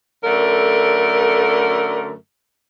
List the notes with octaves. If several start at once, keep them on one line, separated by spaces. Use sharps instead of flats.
F#2 D3 A3 A#4